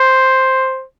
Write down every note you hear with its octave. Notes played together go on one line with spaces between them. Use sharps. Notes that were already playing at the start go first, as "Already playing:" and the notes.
Already playing: C5